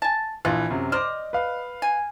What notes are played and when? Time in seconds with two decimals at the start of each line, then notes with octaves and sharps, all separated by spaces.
0.02 G#5 A5
0.45 A#1 E3 F4
0.70 F#2 C3
0.92 C5 D5 D#5 D6 F6
1.33 B4 F5
1.82 G#5